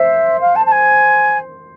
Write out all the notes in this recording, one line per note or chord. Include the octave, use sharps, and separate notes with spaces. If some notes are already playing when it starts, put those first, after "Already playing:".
Already playing: C5 E5
F5
A5
A5
G#5